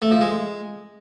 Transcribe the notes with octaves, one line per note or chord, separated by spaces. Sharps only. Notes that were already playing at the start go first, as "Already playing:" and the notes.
A3
F3
G#3